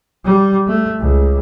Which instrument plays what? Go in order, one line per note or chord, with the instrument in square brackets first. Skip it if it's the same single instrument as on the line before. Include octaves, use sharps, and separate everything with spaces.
[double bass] G3
A3
C#2